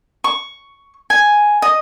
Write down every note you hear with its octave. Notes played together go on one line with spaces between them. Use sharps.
C#6
G#5
D#5